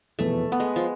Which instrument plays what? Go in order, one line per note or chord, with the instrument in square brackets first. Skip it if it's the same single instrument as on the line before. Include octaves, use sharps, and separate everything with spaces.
[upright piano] F1 E2 B2 B3 [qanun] A3
[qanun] B3
G#3
F3